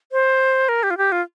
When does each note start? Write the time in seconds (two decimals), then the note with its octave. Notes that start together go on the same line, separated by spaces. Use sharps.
0.12 C5
0.69 A#4
0.83 G4
0.90 F4
0.98 G4
1.12 F4